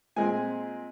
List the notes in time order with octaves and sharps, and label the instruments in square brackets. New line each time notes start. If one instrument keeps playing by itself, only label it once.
[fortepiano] A#2 G#3 C4 G#5